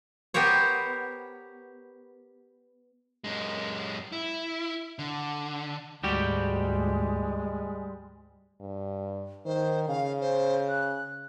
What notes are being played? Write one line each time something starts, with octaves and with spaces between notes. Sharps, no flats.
B3 G4 A#4 C5 C#5
F#2 G#3
E4
D3
D2 G#2 G3 G#3 F#4 G4
G2
D#3 C5
C#3 F5
C5
F#6